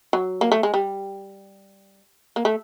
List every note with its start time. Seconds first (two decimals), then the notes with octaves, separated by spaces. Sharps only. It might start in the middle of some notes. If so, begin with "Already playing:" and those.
0.13 F#3
0.41 A#3
0.52 A3
0.63 G#3
0.74 G3
2.36 A#3
2.45 A3